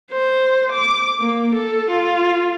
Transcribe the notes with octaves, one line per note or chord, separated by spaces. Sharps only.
C5
D6
A#3
A4
F4